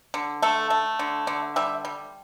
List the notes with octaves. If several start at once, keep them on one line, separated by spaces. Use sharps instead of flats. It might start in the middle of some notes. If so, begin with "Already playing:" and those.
D3
A3 A4
A3
D3
D3
G3 E5
G3